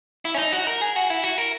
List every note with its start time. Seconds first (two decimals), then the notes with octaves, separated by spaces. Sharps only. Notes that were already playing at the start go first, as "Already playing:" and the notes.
0.25 E4
0.34 C#4
0.38 D#4
0.52 F#4
0.67 A#4
0.81 G#4
0.96 F#4
1.10 E4
1.24 F#4
1.38 A#4